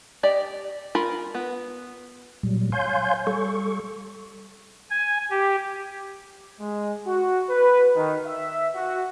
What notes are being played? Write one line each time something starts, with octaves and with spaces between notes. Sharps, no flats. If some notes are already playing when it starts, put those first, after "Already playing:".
G4 D5 D#5
F4 A#4 B5
B3
A#2 F#3 G3
C#5 F5 G#5 C6 G6
G3 A4 C#6
G#5
G4
G#3
F#4
B4
D#3
E5
F#4